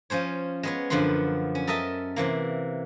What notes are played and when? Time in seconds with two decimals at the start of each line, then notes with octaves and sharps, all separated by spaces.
0.10 F3 C#4 C5 C#5
0.63 G#3 B3 C#5
0.90 F#2 D3 F3 B3 F#5 C6
1.55 C#4
1.67 A4 A#4 D#5 E5 A5
2.16 C3 E3 A#3